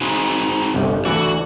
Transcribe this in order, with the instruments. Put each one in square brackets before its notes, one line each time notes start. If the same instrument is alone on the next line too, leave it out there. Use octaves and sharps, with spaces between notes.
[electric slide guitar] C4 D#4 F#4 [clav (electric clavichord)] G#5
[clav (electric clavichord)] G1 C2
[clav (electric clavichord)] D2 E3 D5 [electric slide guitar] F#4